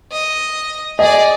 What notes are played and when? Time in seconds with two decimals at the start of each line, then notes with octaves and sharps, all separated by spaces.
0.12 D#5
0.99 G#4 D5 D#5